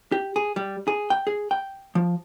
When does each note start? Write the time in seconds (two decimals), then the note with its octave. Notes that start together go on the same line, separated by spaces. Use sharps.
0.12 G4
0.36 G#4
0.56 G3
0.88 G#4
1.10 G5
1.27 G#4
1.51 G5
1.95 F3